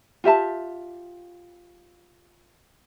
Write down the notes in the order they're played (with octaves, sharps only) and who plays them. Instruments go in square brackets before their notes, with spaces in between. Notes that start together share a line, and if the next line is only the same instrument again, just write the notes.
[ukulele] F4 G4 E5 A5